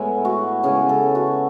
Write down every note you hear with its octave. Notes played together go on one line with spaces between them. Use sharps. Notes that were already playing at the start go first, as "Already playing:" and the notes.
Already playing: A2 G#3 B3 E4
F#4
C#3 G#3 B3 G#4
A4
F#4